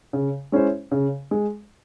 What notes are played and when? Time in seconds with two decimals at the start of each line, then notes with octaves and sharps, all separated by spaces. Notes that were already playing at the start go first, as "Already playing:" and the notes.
0.13 C#3
0.52 G#3 C#4 E4 C5
0.91 C#3
1.31 G#3